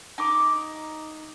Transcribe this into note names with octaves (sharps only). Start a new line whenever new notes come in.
D#4 D6